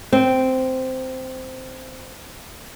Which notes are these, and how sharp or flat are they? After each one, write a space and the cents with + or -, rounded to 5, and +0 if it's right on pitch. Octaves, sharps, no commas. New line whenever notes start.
C4 -10